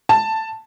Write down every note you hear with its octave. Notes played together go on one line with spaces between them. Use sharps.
A5